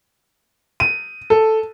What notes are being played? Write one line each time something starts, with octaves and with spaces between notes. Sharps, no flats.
D#7
A4